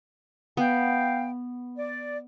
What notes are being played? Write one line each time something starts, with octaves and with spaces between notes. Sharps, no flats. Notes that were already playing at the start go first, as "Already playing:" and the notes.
B3 F5 G5
D5